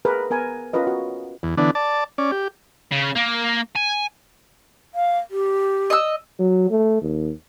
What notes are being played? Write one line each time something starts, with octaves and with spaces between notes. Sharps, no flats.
G#4 A#4 B4
B3 A#4 G#5
C#4 F4 A#4 B4 D#5
F#4
E2
D3 E3 B3 D4
D5 A5
C#4 D5
G4
C#3
A#3
G#5
F5
G4
D#5 E6
F#3
A3
D#2